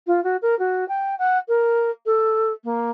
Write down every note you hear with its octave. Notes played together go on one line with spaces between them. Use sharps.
F4
F#4
A#4
F#4
G5
F#5
A#4
A4
A#3